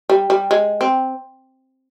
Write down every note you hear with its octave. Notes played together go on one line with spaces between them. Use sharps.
G3
G3
G#3
C4